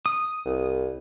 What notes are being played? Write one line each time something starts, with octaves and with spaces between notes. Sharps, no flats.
D#6
C2